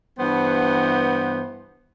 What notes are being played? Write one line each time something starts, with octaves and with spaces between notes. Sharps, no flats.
G2 E3 B3 C5 F#5